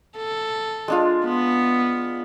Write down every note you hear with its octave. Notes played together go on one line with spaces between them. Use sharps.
A4
G#3 D4 F4
B3